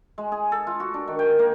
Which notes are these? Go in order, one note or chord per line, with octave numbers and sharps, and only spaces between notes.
G#3
G#4
A4
F4
F#4
D4
D#3
G5
A#3